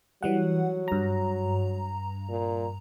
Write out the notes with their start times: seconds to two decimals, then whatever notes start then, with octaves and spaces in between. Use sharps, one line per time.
0.23 E3 F#3 G3 F#5
0.88 G2 A#5
2.29 A#2